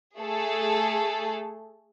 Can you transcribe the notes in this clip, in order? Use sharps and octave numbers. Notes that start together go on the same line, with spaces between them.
A3 G#4 A4